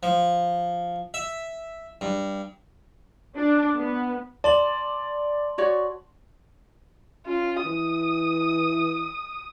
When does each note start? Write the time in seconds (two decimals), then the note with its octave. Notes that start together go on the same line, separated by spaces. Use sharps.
0.03 F3
1.14 E5
2.01 G2
3.34 D4
3.74 B3
4.44 D5 A5 C6 F#7
5.58 F#4 C#5 D5
7.27 C#4 F4
7.64 E3 D#6